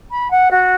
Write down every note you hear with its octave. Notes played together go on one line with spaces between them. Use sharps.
B5
F#5
F#4